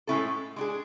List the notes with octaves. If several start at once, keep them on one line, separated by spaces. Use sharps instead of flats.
A2 G#3 C#4 E4 A4
G#3 D4 G#4